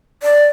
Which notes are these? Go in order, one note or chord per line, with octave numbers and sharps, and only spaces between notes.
D5